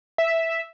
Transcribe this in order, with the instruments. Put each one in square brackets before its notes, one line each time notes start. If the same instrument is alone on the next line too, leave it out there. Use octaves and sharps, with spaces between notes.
[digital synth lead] E5